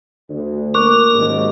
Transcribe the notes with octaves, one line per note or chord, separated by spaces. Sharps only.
D2
A#3 A#4 C#6 D6 F#6
F#1 D#2 G#2